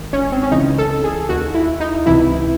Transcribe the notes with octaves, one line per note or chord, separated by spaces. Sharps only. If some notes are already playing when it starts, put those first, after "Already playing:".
Already playing: G#1 G#2 D#3
C#4
C4
C#4
C#2 C#3 E3 D#4
A4
G#4
D#2 D#3 F#4
E4
D#4
C#2 C3 E3 E4